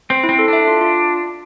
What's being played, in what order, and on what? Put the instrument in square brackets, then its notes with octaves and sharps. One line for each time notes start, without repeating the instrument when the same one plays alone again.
[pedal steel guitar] C4 [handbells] C5
[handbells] E4
[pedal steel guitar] C4
[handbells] A4
[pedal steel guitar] D4 [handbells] E5
[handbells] F4
F4